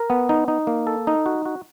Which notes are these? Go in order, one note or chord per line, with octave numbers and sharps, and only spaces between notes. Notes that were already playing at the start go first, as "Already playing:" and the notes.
Already playing: A#4
B3
D#4
D#4
A#3
A4
D#4
F#4
F#4